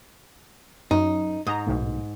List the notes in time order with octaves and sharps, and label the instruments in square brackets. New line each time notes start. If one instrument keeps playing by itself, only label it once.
[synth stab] F#2 [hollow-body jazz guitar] D#4
[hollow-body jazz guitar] G#2 [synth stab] D#5 A#5
[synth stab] B1 A2